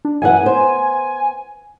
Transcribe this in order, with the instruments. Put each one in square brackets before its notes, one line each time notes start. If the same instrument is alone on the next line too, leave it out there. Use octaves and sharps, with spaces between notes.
[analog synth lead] D4
[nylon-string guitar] F#2 E3 F#5 [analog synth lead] G#5
[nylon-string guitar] B3 C5